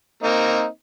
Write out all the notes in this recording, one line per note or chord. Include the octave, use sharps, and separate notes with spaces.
A#3 C4 D#4